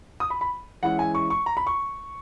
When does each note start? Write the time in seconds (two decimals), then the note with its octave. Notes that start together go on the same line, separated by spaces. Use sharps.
0.20 D#6
0.30 B5
0.41 B5
0.83 E3 G#3 C#4 E4 F#5
0.99 G#5
1.15 C#6
1.30 C#6
1.46 A#5
1.57 B5
1.67 C#6